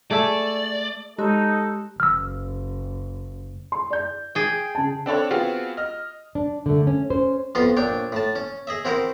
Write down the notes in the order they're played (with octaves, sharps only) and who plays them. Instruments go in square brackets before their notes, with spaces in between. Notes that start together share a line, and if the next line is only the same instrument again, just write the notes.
[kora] A3 [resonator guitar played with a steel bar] G#4 E5 [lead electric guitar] D5
[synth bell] G#3 G4 F#6 [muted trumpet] D#4 [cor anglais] A4
[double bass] F#1 [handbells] E6 F6
[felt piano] C6
D5 G6
[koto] G#4 G5
[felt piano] C#3 A5
[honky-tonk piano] C4 D4 A4 C#5
B3 C4 F4 F#4 G#4
D#5 F6
[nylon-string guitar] D4
D3 A3
C#4
C#4 C5
[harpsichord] F2 B3 F4 F#4 C6
A#1 D4 C#5 G5
A2 A5
C#4
G#4 D#5 E5
C4 E4 F#4 A#4 C5